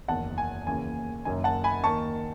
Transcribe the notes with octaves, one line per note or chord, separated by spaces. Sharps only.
F#1 E2 D#3 F#5 A5
G#5
D#2 C#3 E3 G#5
F#1 F#2 D#3 G#5
F#5 A5
G#5 B5
D#2 D#3 A5 C#6